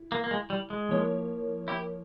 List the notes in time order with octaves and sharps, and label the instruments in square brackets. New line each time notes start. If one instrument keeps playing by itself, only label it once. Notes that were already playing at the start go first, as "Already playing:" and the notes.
Already playing: [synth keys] E4
[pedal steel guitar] A#3
A#3
G#3
G3
G#3
[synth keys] F3 A#3 E4 A#4 C#5
[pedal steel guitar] E4 G4